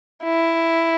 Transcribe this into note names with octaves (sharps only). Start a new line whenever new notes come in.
E4